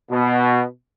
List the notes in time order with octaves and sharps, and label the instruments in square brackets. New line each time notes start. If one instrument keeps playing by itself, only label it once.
[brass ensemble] B2